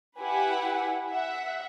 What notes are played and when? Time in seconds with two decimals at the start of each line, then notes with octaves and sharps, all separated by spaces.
0.19 E4 G4 B4 F#5 G#5
1.10 E5 F#5